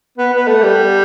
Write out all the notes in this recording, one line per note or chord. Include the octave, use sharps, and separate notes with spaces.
B3
B3
A3
G3